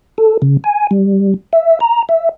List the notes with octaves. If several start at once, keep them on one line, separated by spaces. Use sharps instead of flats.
A4
C#3
G#5
G3
E5
A#5
E5